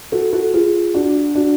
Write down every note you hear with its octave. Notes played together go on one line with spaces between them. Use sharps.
F#4 A4
F#4 A4
F4 G#4
D4 F#4
D4 F#4